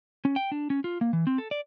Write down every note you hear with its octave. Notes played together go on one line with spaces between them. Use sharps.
C#4
G5
D4
C#4
F4
A#3
E3
C4
A4
D5